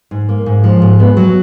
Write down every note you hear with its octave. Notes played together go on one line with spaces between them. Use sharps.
G#2
A#3
G#2
F3
G#2
B3
F#3